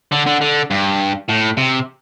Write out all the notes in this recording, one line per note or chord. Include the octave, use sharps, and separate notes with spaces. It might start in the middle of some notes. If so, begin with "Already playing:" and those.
D3
D3
D3
G2
A2
C3